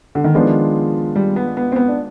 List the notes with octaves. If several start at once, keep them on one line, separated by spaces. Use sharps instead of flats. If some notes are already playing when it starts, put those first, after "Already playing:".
D3
D#3
D#3 F3 G#3 B3 D4 F4
G3
B3
B3
C4
B3
D4